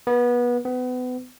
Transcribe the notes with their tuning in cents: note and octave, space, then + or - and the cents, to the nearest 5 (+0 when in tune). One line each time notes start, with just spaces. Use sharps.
B3 -25
B3 +30